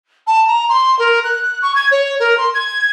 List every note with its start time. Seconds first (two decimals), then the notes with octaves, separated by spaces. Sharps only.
0.27 A5
0.48 A#5
0.69 C6
0.99 A#4
1.24 F#6
1.62 C#6
1.75 G#6
1.91 C#5
2.20 A#4
2.38 C6
2.54 G#6